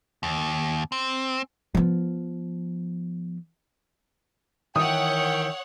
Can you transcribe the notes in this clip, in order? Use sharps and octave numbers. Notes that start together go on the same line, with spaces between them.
D#2
C4
F3 B3
D#3 E3 A#4 C#5 E5 F#5 G5 D#6